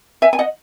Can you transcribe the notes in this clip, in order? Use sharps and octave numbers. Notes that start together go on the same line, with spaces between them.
E5 G#5
G#5
D#5 F#5